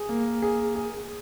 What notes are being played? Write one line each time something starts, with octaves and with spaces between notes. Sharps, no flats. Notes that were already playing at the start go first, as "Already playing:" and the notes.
Already playing: G#4
A#3
G#4
G#4